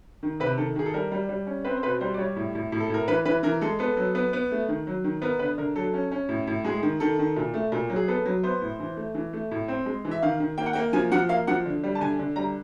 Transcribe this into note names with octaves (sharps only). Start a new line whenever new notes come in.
D#3
C3 B4
D#3 A4
D#3 G#4
A4
G3 A#4
G3
G3
C#4
C4 B4
C5
B2 B4
G3 C5
D5
G3 C#5
A2
A2
A2
A4
A2 A#4
E3 B4
E3 B4
E3 A#4
G#3 A4
B3 A4
F#3
B3
B3
A3
D#3
F#3
D#3
B3 A#4
D3 B4
D3 A#4
F#3 A4
C#4
C#4
A2
A2
G#3 G#4
D#3
D#3 A4
D#3
A#2
A3
A#2
F#3
G#4
B3 A4
F#3
B3 C5
A2
E3
A3
E3
A3
A2
C4
G#3
E3
E5
D#3 F5
D#3
A#3 G5
F#5
A#3 G5
F3 G#5
F3 F#5
A#3 F5
F3 F#5
D3
G3
A5
D3 G#5
D3
G3 A#5